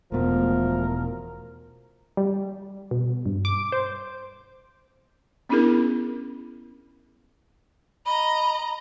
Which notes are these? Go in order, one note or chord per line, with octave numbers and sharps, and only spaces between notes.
E1 B2 F3 A3 A#4
G3
B2
G2
D6
C5
B3 C#4 D4 E4 G#4 A#4
D#5 A#5 B5